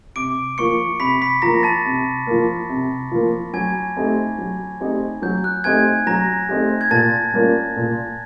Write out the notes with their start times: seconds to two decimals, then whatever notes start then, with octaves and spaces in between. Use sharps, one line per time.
0.16 C3 D6 D7
0.58 F3 A#3 C#6 C#7
1.00 C3 B5 B6
1.21 B5 B6
1.42 F3 A#3 A#5 A#6
1.63 A5 A6
1.85 C3
2.27 F3 A#3
2.69 C3
3.11 F3 A#3
3.53 F#3 G#5 G#6
3.96 A3 C4 D#4 G4
4.38 F#3
4.80 A3 C4 D#4 G4
5.22 F#3 G6
5.44 F#6
5.64 A3 C4 D#4 G4 G#5 G#6
6.07 F#3 A#5 A#6
6.49 A3 C4 D#4 G4
6.81 G#6
6.91 A#2 A5 A6
7.34 G3 A#3 C#4 F4
7.76 A#2